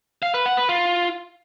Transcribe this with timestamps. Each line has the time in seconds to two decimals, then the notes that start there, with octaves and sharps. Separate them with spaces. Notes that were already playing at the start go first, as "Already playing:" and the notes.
0.23 F5
0.34 B4
0.46 F#5
0.57 B4
0.69 F4